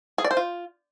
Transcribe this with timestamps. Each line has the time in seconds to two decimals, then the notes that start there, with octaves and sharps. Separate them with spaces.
0.18 G#4
0.24 D5
0.31 C5
0.37 F4